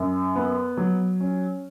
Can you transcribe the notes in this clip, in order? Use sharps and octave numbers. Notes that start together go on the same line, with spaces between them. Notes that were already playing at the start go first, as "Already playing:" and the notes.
Already playing: F#2
B3
F#3
C#4